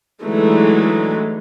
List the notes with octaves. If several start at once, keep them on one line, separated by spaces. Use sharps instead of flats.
D3 E3 F#3 G#3 A3 D#4